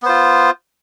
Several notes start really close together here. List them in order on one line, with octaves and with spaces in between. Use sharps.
B3 C5 F4